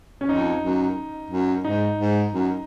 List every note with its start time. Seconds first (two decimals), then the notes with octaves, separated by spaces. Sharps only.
0.21 C#4
0.29 F2 D#4
0.63 F#2
1.31 F#2
1.65 G#2 D#4
1.98 G#2
2.32 F#2